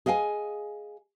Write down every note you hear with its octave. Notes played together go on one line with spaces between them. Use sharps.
G#4 D#5 F5 G5 G#5